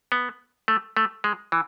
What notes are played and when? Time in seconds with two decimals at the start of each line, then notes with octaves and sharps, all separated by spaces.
0.12 B3
0.68 A3
0.97 A3
1.24 G#3
1.52 E3